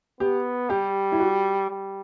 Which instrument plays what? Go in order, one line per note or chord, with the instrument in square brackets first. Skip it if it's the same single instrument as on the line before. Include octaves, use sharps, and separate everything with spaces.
[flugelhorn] B3 [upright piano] G4
[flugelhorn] G3 [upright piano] G4
[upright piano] E4
F#4
[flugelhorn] G3